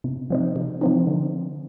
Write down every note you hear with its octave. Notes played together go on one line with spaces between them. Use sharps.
C3
F3 C4 D#4
C3
F3 C4 D#4
D3